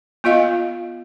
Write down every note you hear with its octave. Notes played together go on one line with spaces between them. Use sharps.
B3 F4 D#5 F5